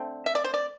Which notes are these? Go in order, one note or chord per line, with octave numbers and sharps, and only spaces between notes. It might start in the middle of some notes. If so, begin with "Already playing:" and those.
Already playing: D3 A3 C4
E5
D5
C5
D5